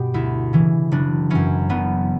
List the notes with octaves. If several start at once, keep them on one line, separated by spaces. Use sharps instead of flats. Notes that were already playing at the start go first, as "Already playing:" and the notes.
Already playing: G2 B2 G4
D2 E4
C#3 E3
F#1 D4
F#2 E3 C#4
F#1 B3